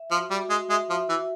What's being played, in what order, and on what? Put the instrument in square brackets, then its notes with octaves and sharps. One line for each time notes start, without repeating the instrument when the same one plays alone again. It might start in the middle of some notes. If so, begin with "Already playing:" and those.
Already playing: [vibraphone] E5
[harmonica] F3
[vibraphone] F#4
[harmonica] G3
[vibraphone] F#4
[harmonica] G#3
[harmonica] G#3 [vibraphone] E5
[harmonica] F3
[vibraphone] E5
[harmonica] E3